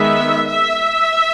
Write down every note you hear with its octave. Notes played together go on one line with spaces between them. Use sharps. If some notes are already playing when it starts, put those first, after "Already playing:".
Already playing: D#3 G#3 B3 E5
E5